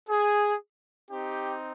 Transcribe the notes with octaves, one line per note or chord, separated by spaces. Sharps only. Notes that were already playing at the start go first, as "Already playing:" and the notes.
G#4
C4 D#4 G4